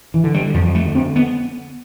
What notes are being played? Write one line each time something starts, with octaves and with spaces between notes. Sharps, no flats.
E3
D3
G3
F2 F3
A3
D3
C4
B3